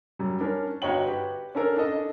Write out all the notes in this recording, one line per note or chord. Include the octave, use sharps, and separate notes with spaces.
F#2 G3
C#4 D4 A#4
G1 F#4 C#5 D#5 G5 F#7
G4 B4
C#4 D4 A4 A#4
D4 A4 D#5